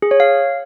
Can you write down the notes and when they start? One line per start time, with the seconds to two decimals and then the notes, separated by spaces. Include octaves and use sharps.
0.02 G#4
0.11 C#5
0.20 F5